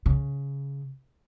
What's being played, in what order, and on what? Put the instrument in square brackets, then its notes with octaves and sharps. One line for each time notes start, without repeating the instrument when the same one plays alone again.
[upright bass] C#3